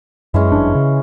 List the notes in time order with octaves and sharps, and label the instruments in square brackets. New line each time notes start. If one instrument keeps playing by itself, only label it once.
[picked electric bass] F#2 [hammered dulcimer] E3 G#3 C#4
[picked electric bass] G1 F#2 D4
C#3